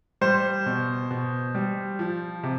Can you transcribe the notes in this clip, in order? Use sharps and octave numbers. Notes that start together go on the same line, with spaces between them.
G3 C5
B2
B2
G3
F3
C3